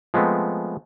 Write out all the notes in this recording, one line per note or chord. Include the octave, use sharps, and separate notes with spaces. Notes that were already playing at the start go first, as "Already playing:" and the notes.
F3 G#3 A3 B3 C4